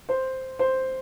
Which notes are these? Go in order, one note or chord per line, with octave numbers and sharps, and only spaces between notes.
C5
C5